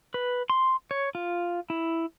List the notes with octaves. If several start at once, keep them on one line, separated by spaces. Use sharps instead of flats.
B4
C6
C#5
F4
E4